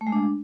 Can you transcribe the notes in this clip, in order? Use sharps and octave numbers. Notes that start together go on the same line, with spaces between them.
A3
G#3
D4